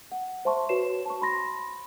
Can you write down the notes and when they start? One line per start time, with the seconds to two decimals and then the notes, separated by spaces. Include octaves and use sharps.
0.12 F#5
0.45 C5 E5 A5 C6 C#6
0.69 F#4 B4 C#5 C7 E7
1.06 A5 C#6
1.22 B5 C6 A#6